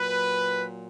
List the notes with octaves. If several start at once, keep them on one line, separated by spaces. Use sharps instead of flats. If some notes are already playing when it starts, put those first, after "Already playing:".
Already playing: A#2 F#3 B4